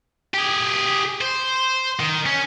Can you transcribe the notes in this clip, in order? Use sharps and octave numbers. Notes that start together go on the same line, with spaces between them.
G4 G#4
C5
D#3
C#4